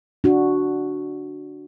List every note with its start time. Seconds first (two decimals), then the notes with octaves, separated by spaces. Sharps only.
0.24 D4 F#4